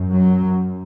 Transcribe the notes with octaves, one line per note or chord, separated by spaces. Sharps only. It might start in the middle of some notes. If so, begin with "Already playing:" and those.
Already playing: F#2
F#3